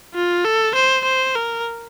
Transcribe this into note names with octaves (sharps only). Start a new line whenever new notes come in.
F4
A4
C5
C5
A#4